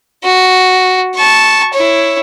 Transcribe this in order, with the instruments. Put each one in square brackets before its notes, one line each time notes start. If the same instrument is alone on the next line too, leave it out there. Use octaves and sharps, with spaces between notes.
[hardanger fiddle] F#4
A5 C#6
E4 C#5